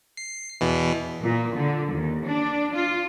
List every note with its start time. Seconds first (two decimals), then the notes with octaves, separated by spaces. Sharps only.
0.17 C7
0.61 E2 B2 E3
1.21 A#2
1.56 D3
1.93 D#2
2.25 D4
2.74 F4